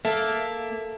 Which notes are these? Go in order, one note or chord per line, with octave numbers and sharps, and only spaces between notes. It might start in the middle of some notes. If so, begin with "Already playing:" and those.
A#3 A4 E5